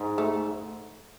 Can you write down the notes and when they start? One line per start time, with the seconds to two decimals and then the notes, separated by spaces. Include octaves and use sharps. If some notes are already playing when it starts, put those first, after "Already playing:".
Already playing: G#2
0.18 A3